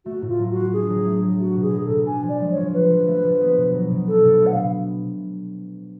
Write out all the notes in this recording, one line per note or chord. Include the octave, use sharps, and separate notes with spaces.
A3 F#4
A2
F4
F#3
F#4
F4
D4 G#4
F#3
A3
F#3
A3 F#4
B2
G#4
F#3
B2 A4
D4 G#5
F3
D5
G#3
F3 C#5
F4 B4
F3
A3
F3
B3
B2
F#3
B2
D4 A4
B2
A3
F#5
F5
B2